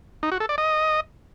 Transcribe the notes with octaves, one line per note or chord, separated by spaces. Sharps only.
D#4
F#4
A4
D5
D#5